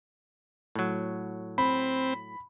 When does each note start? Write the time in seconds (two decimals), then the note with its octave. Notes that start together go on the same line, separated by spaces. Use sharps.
0.75 A2 F#3
1.58 C4 B5